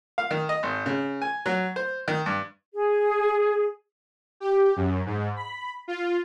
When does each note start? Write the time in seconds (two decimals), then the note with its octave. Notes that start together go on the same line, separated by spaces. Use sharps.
0.18 F5
0.31 D#3
0.49 D#5
0.63 G#1
0.86 C#3
1.22 G#5
1.46 F#3
1.76 C5
2.08 D#3
2.26 G2
2.74 G#4
4.40 G4
4.76 F#2
5.06 G#2
5.36 B5
5.88 F4